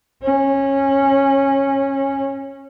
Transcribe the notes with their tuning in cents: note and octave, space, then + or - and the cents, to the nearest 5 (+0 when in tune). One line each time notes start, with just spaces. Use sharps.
C#4 -20